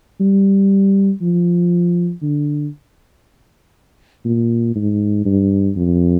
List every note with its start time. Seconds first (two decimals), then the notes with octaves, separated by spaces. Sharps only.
0.20 G3
1.21 F3
2.22 D3
4.25 A#2
4.75 G#2
5.25 G2
5.77 F2